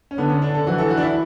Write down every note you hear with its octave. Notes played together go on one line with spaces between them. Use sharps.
C#4
D3 B3
C#4
D4
A4
E3 F#4
A4
F#4
D4
E4